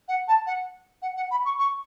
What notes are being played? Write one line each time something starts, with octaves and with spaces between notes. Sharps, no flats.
F#5
A5
F#5
F#5
F#5
B5
C#6
C#6